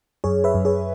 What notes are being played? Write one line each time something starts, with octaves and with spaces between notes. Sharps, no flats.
F#2 G#4 C#5
B4 E5
F#2
G#4 C#5